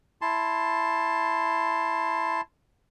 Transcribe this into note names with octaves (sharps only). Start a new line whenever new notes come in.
E4 A5 C6